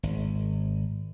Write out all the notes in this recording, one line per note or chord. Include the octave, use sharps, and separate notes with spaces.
G#1